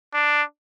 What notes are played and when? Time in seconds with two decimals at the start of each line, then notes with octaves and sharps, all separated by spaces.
0.14 D4